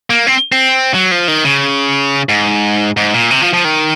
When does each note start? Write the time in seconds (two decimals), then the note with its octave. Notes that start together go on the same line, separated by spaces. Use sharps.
0.10 A#3
0.27 C4
0.52 C4
0.94 F#3
1.11 F3
1.28 D#3
1.45 C#3
2.29 G#2
2.97 G#2
3.14 A#2
3.30 C3
3.41 F3
3.53 F3
3.64 D#3